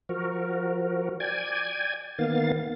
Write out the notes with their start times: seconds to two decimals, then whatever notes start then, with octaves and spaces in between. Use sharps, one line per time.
0.09 F3 F#4 A#4
1.20 D5 G5 G#5 G#6
2.19 D#3 A#3 B3 F5 A6